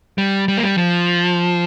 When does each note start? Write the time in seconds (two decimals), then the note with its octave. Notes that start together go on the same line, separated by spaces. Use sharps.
0.18 G3
0.48 G3
0.57 A#3
0.63 G3
0.78 F3